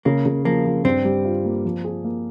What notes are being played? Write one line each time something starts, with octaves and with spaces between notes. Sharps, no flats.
C#3 A#3
C#3
F3 A#3
F3
G2 C4
G3
F4
A#3
F3
G#4
A#3